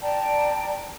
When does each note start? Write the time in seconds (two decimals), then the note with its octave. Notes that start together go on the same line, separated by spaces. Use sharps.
0.02 D5 G5 A5 A#5